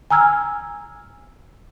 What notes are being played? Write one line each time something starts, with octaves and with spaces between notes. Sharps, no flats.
G#5 A#5 E6 F6 G#6